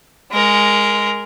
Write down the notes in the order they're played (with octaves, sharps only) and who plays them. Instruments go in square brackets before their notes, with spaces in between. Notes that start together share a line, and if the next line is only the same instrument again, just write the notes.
[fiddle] G#3 A#4